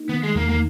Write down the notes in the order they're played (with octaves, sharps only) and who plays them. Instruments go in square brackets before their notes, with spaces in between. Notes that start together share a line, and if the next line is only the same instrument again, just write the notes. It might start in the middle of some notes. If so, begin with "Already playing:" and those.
Already playing: [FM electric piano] A#3 D#4
[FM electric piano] D#3 [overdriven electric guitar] B3
[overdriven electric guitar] G#3
[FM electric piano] E2 [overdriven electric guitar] A#3
[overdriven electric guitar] A#3